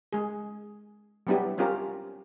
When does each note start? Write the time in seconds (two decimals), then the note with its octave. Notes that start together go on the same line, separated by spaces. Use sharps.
0.12 G#3 G#4
1.27 F#3 G3 B3 D4 E4 G4
1.58 C4 C#4 F4 G4 A#4